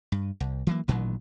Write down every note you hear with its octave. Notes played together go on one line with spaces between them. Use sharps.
G2
C2
E3 F#3 A#3
A1 A#2 D#3 F#3